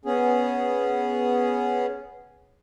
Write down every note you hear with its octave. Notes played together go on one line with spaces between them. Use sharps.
B3 C#4 G#4